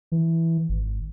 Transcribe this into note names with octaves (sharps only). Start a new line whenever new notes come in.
E3
G#1